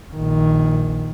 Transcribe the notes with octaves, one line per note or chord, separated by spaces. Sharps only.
A#1 D#3